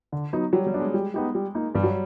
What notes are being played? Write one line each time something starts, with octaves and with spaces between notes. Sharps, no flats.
D3
F#3 B3 D#4
F#3 G3
G3
B3 D4
G#3
G3
B3 D#4 G4
G3
A#3 D#4
G2 G3
F#3